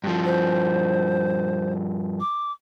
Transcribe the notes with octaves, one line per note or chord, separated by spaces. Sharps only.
G2 F3
C5
D6